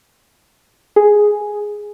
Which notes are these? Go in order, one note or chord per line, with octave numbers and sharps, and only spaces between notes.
G#4